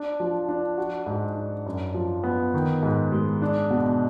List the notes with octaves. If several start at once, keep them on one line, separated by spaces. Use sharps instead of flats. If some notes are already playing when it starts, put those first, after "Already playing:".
Already playing: D4
F3
D4
F#4
G#2
D4
F#2
F3
B3
D#3
G#2
G#3
D4
B2